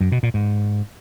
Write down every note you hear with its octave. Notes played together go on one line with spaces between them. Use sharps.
F#2
B2
A#2
G#2